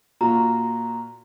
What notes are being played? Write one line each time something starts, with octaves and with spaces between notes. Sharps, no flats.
A#2 F4 F#4 A#5